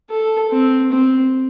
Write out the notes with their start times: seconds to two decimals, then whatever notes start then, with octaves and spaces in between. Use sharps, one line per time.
0.10 A4
0.51 C4
0.92 C4